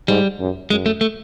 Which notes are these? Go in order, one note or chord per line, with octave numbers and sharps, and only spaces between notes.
G#2 G3
F#2
F#2 G#3
A3
A3